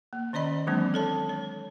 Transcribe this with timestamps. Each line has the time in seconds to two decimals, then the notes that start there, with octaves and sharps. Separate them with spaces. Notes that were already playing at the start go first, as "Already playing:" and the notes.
0.13 A#3
0.33 D#3 C#4 D5 D#5 B5
0.67 E3 F#3 G#3 A#3 C4 D4
0.94 A4 C#5 A5
1.29 C#5